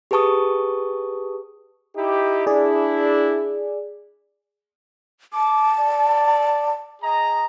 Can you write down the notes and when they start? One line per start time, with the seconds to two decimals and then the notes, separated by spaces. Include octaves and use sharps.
0.11 G4 G#4 B4 A5 C#6 D#6
1.96 D#4 E4 G4
2.46 D4 E4 G#4 D5
5.33 A5 D6
5.79 D5
7.02 G#4 D#5 A#5